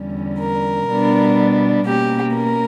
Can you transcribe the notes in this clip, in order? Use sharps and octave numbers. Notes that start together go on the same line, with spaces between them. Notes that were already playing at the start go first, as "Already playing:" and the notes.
Already playing: E2 D3 G3 C#4
A#4
B2 G3 B3 D4
B2 A#3 C#4 G4
A#4